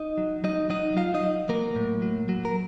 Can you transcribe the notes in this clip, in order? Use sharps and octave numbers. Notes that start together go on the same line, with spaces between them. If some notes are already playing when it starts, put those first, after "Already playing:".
Already playing: D#4 D#5
F#3
F#3 D#4 D#5
F#3 D#4 D#5
F#3 F4 F5
D#4 D#5
F#3
F#3 A#3 A#4
A2
F#3
F#3
A#4